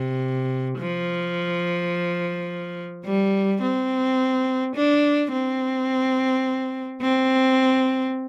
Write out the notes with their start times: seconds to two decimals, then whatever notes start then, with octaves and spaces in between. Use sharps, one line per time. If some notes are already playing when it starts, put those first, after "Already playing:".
Already playing: C3
0.78 F3
3.05 G3
3.62 C4
4.76 D4
5.32 C4
7.02 C4